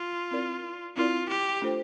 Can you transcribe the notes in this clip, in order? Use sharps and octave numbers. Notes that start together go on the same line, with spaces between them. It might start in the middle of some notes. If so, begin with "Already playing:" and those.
Already playing: F4
C4 E4 A#4 D5
C4 E4 F4 A#4 D5
G4
A3 D4 F4 A4 C5